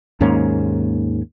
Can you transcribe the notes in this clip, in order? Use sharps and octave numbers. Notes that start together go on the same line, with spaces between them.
D#2 G#2 A#3 C#4